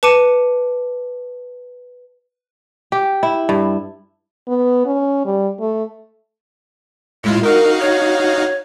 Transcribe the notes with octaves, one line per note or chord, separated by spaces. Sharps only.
B4 A5 D6 C#7 D#7
G4
E4
G2
B3
C#4
G3
A3
A2 G#3 E4 F4
D#4 F#4 A#4 F5
C#5